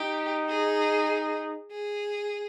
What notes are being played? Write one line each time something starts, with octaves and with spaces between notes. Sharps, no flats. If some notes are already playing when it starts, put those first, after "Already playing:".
Already playing: D#4 G4
G#4
G#4